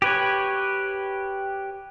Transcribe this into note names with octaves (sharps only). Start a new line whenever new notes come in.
G4 B4 C#5